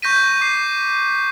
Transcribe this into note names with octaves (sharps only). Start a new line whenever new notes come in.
C#6 G6 A#6 B6 D#7
D6 C7